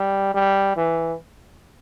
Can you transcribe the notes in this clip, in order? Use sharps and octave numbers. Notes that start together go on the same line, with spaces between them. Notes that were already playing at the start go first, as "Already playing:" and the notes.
Already playing: G3
G3
E3